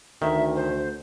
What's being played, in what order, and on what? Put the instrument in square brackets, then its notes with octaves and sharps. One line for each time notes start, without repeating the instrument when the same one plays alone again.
[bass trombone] D2 [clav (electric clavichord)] D#3 [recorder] E5
[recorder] C5